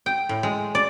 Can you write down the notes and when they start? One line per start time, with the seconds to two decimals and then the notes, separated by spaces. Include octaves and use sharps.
0.06 G5
0.29 A2
0.43 G#3
0.75 D5